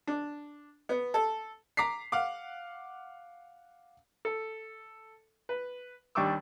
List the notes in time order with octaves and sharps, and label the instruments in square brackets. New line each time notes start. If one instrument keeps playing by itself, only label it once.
[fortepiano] D4
B3
A4
[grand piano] A#5 D6 B6 C7
F5 F#5 D6
[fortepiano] A4
B4
D#2 G3 D4 C#6 D6 E6